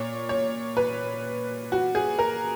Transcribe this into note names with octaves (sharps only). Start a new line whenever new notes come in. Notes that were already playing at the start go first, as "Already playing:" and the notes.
Already playing: A#2 C#5
C#5
B4
F#4
G#4
A#4